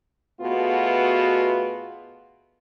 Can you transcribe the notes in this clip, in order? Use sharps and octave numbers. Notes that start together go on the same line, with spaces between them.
B2 A3 B3 F4 F#4 G#4